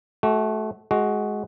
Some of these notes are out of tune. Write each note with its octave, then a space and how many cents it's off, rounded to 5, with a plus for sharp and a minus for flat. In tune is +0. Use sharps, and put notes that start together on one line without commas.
A3 -25 F#4 +20
G#3 +15 F#4 +5